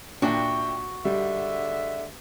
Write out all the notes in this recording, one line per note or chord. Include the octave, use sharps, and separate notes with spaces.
A#2 D4 F#4 E5 G5
D3 G3 G#3 E5